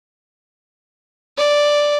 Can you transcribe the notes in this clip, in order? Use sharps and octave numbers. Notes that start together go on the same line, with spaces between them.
D5